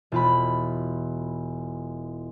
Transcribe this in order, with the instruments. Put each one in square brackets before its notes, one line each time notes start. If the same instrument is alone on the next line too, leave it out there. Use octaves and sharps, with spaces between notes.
[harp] E1 F4 B5